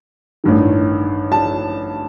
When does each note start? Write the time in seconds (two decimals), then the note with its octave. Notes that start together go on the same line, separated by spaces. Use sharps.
0.44 A1 G2 D#3
1.32 A5